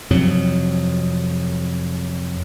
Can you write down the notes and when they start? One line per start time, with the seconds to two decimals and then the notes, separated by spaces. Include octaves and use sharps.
0.10 F2 C3 F#3